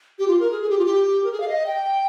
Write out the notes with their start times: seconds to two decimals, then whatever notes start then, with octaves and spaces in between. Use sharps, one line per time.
0.19 G4
0.28 F4
0.40 A#4
0.51 G#4
0.62 G#4
0.70 G4
0.79 F4
0.85 G4
1.24 A#4
1.32 G#4
1.40 F5
1.48 D#5
1.66 G5